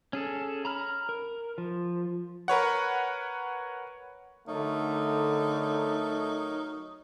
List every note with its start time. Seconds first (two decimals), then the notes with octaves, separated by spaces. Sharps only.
0.13 C#4 G#4 A4
0.65 A#5 B5 F6
1.09 A#4
1.58 F3
2.48 A#4 B4 C#5 F#5
4.48 D3 F#3 A3 D#4 A#4 C#5